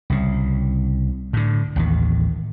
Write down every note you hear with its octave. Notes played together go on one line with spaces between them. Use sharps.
C2 C#3
A2 D3
A1 D#2 D#3